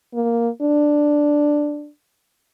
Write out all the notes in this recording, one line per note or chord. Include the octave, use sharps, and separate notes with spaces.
A#3
D4